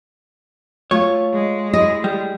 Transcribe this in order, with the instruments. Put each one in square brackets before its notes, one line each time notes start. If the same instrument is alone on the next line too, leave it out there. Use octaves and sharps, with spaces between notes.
[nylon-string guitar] A3 F4 [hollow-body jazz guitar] C#5
[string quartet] G#3
[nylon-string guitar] E4 G#4 D#5
[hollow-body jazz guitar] G3